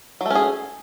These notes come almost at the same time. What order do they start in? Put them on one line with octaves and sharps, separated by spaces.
F#3 A3 C#4 G#4